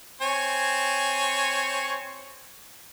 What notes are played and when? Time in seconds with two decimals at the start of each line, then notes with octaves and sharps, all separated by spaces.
0.22 C4 C#5 G#5